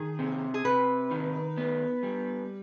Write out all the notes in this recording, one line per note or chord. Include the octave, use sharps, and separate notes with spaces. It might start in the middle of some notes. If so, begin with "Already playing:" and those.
Already playing: D#3 G#4
C3
G#4
C3 B4
D#3
B3
G3